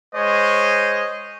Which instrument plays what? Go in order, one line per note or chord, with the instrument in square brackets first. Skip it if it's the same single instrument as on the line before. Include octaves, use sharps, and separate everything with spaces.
[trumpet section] G#3 C5 C#5 D#5